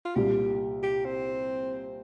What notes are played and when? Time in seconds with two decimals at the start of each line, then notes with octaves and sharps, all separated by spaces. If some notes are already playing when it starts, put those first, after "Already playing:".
0.05 F4
0.15 C2 A#2 G3 G4
0.83 G4
1.05 C4